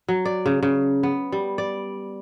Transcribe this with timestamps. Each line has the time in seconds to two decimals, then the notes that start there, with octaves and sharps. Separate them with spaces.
0.08 F#3
0.25 D5
0.46 C#3
0.63 C#3
1.03 B3
1.32 G3
1.58 D5